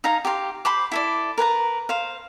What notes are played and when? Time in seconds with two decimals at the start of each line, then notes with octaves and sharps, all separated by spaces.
0.04 D#4 F5 G#5 A#5
0.25 G4 F5 C6
0.65 C5 B5 C6 D6
0.92 E4 A4 D5
1.38 A#4 B4 G#5 A#5
1.89 C5 F5